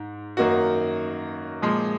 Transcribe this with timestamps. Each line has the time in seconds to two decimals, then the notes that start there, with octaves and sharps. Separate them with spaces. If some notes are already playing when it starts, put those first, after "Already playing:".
Already playing: G#2
0.37 F#2 D#3 A#3 D#4 F#4
1.62 A#2 F3 G#3